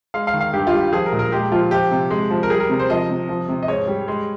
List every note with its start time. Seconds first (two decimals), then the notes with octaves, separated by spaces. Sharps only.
0.14 G#3 F5
0.27 F5
0.34 D#3
0.41 F5
0.53 G2 G4
0.67 F4
0.73 G3
0.80 G4
0.93 F3 G#4
1.06 A#4
1.13 A#2
1.19 A#4
1.32 G#3 G4
1.52 F3 F4
1.71 F3 G4
1.91 C3
2.11 G#3
2.31 F3
2.43 A#4
2.50 G3 G#4
2.60 A#4
2.70 C3
2.79 C5
2.90 F3 D#5
3.09 C3
3.29 F3
3.49 C3
3.63 D#5
3.68 G#2 C#5
3.88 G3
4.08 G#3